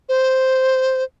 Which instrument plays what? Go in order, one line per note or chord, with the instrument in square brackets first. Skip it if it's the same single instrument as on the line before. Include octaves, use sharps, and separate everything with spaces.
[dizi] C5